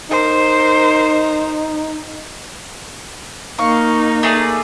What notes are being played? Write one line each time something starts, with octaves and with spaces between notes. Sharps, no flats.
D#4 A#4 C5
A#3 D#4 F5 C#6
A3 G#4 D5